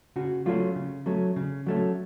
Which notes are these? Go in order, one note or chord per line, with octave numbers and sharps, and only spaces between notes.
C#3 F#4
F#3 A3 C#4 F4
C#3
F#3 A3 C#4
C#3
F#3 A3 C#4